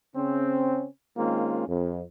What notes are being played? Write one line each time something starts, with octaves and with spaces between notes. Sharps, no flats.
C#3 C4 C#4
D#3 G#3 A#3 C4 C#4 F4
F2